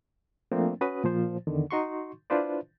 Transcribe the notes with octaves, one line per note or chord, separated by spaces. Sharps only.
F3 A3 A#3 C4 D4
C#4 F#4 B4 D#6
A#2 F3 C5
E2 D3 D#3
D#4 F#4 C6 C#6
D4 E4 F4 B4 C5 D5